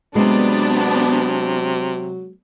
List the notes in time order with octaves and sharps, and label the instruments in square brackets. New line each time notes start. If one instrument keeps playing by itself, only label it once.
[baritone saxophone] C3 [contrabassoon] F#3 [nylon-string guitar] G#3 [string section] B3 D4